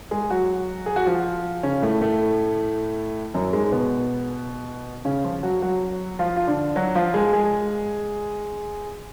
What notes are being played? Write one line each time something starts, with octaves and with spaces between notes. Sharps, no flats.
G#3 G#4
F#3 F#4
G#4
F#4
F3 F4
C#3 C#4
A2 A3
A2 A3
F#2 F#3
G#2 G#3
B2 B3
C#3 C#4
F3 F4
F#3 F#4
F#3 F#4
F3 F4
F4
D3 D4
F#3 F#4
F3 F4
G#3 G#4
G#3 G#4